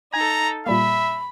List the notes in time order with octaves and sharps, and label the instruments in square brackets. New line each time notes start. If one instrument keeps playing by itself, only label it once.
[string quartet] D#4 A4 [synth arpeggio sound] G#5 G#6 [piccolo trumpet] A#5
[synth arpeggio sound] A#2 G3 A#3 [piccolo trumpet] E5 [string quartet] B5